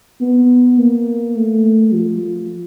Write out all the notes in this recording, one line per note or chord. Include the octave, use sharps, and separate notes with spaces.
B3
A#3
A3
F3